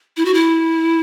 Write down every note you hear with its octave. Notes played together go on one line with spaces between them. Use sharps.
E4
F#4
E4